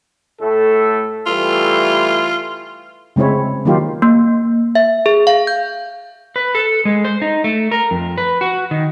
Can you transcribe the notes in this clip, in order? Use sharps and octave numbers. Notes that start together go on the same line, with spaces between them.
A2 A3 A4
E3 G3 A3 F4
C#3 G#3 C4 E4 C#5
D#3 F#3 A#3 D#4 F4 G4
A#3
E5
G#4
F5
G6
B4
A4
G#3
C5
D#4
A3
A#4
F2
B4
F#4
D#3